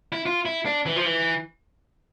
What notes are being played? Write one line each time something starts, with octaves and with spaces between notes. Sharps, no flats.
E4
F4
E4
D4
E3
F3
E3